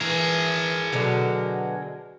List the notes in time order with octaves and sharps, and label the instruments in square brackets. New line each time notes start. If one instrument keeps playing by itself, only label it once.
[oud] E3 [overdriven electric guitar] G#4 A#4
[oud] B2 D3 F#3